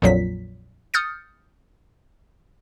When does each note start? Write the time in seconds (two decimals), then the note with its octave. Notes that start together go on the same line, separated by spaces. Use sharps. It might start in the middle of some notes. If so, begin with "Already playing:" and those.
0.02 A#1 F2 A#2 F#3 B6
0.94 D#6 F6 G6 A6 C#7